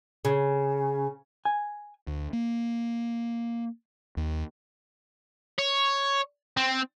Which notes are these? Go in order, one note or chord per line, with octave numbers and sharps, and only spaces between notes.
C#3
G#5
D2
A#3
D#2
C#5
C4